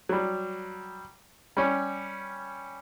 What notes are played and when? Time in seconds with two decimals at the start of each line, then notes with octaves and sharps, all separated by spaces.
0.09 F#3 G3
1.57 G3 C#4